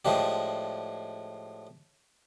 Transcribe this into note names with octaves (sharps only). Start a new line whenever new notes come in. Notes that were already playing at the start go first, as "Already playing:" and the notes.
A2 F3 G#3 D4 G4